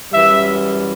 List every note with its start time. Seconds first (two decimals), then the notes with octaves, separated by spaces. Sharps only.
0.12 F#2 E3 G3 E5